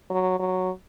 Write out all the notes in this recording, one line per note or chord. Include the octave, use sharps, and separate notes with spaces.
F#3
F#3